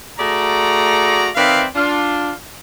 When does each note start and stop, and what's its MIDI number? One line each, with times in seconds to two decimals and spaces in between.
0.18 1.27 57
0.18 1.27 66
0.18 1.27 68
0.18 1.27 74
0.18 1.27 82
1.35 1.64 51
1.35 1.64 60
1.35 1.64 71
1.35 1.64 74
1.35 1.64 76
1.35 1.64 77
1.75 2.31 62
1.75 2.31 65